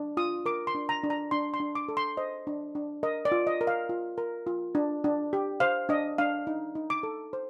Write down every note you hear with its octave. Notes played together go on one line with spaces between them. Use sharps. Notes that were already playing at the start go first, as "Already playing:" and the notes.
Already playing: D4
F4 D#6
A#4 D6
C6
D4
A#5
D4
A#5
D4 C6
C6
D4
D6
A4
C6
C5 D#5
D4
D4
A#4 D#5
D5
F4
D#5
A#4
F5
F4
A#4
F4
D4
D4
G4
C5 F5
D4 D#5
D4 F5
D#4
D#4
D6
A4
C5